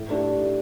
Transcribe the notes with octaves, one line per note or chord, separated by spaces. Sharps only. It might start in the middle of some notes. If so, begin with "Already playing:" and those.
Already playing: A2
A3 D4 G4